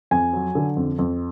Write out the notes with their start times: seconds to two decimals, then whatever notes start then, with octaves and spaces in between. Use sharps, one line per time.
0.11 F2 G#5
0.33 F#3
0.55 D3
0.77 F2
0.99 F2